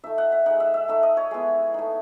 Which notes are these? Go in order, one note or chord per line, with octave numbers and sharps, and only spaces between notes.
A3 D#4 E5
F#5
E5
G#3 D#4 F#5
E5
E5
A3 D#4 E5
D#5
C#5
G#3 B3 E4
A3 D#4